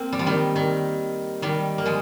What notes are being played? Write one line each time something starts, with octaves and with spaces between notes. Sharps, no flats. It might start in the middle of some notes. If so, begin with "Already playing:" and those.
Already playing: A#3 C4
G3
F3
D#3 G3
D#3
D#3 G3
A#3
F3 G#3